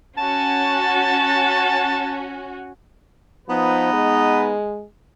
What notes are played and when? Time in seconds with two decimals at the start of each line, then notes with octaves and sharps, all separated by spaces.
0.18 C#4 F#4 A5
3.48 F3 B3 D#4 B4
3.93 G#3